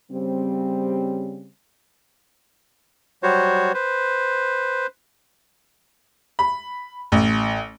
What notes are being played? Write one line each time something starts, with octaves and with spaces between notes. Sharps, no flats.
C#3 G3 C4
F#3 G3 F#4 C5 C#5
B4 C5
B5
A1